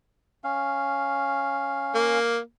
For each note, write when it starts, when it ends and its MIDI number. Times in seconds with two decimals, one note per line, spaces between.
0.44 2.19 61
0.44 2.19 77
1.95 2.38 58